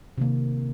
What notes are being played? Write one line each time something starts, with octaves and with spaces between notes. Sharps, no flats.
C3 D#3 A#3